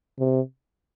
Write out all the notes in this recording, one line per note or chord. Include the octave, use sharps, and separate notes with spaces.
C3